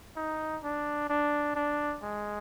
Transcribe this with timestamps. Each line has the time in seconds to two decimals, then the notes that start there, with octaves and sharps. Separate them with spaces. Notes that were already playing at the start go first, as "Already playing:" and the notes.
0.16 D#4
0.63 D4
1.10 D4
1.56 D4
2.03 G#3